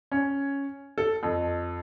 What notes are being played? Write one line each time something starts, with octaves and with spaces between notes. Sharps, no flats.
C#4
A4
F2